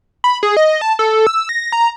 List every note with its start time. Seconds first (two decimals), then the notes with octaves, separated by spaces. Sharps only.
0.24 B5
0.43 G#4
0.57 D#5
0.81 A5
0.99 A4
1.27 E6
1.49 A#6
1.72 A#5